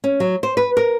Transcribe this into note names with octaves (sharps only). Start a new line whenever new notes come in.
C#4
F#3
C5
B4
A#4